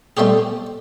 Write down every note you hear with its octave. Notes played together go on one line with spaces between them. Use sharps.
G3 A3 C4 G4 G#4